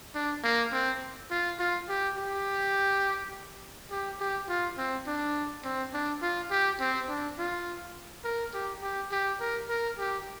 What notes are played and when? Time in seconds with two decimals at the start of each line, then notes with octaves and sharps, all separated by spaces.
0.15 D4
0.44 A#3
0.72 C4
1.30 F4
1.59 F4
1.89 G4
2.17 G4
3.91 G4
4.20 G4
4.48 F4
4.78 C4
5.07 D4
5.64 C4
5.93 D4
6.22 F4
6.50 G4
6.80 C4
7.09 D4
7.38 F4
8.24 A#4
8.54 G4
8.82 G4
9.11 G4
9.40 A#4
9.69 A#4
9.98 G4